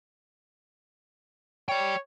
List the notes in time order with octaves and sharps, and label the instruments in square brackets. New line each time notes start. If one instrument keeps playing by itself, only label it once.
[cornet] C#5 [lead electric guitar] D5 G5